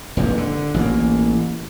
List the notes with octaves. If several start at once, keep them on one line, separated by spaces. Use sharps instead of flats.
F1 A#1 E2
D3
A1 E3 A#3